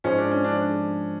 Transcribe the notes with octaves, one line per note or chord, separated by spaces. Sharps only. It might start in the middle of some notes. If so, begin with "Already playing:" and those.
G#2 F3 G#3 C#4
D4
C#4
D4
D4